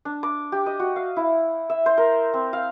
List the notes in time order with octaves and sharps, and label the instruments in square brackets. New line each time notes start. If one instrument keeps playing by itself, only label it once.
[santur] D4
D6
G4
D#5
F#4
F5
E4
E5
C5
A#4
C4
F5